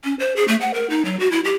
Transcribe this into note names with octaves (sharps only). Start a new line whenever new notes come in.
C#4
C5
G#4
A3
F#5
A#4
D#4
F#3
F#4
E4
G4